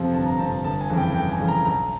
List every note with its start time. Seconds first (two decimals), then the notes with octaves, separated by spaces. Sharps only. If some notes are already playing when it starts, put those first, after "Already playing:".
Already playing: F2 C3 F3
0.13 G1 A5
0.26 A#5
0.39 F2 C3 F3 A5
0.64 G1 A5
0.81 G#5
0.90 F2 C#3 E3
0.98 G5
1.15 G1 G5
1.32 G#5
1.40 F2 C#3 E3
1.48 A#5
1.65 B1 A#5